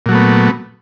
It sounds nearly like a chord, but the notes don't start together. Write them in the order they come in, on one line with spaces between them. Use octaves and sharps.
A#2 F#3 A3 B3